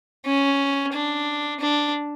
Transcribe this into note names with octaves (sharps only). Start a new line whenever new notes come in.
C#4
D4
D4